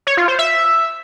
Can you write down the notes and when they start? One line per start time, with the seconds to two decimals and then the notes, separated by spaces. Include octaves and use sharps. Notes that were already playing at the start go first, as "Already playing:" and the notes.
0.07 C#5
0.17 F4
0.28 C5
0.39 E5